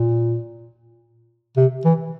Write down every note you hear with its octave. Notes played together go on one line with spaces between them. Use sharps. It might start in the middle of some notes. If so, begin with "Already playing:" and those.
Already playing: A#2
C3
E3